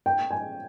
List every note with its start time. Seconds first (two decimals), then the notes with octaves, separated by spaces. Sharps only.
0.06 G5
0.31 G#5